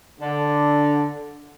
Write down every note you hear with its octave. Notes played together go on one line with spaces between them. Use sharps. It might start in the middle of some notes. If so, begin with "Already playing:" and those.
D3